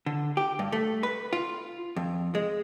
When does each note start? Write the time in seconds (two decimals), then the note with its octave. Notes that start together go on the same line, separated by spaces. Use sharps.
0.06 D3
0.37 G4
0.59 G2
0.72 A3
1.03 B4
1.33 F4
1.97 F2
2.35 G#3